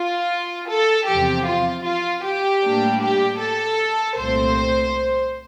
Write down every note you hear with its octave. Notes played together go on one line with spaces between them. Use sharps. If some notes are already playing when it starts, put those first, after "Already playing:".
Already playing: F4
A4
E2 C3 F3 G4
F4
F4
G4
A2 G3 A#3 D4
G4
A4
C2 A#2 A3 C4 C5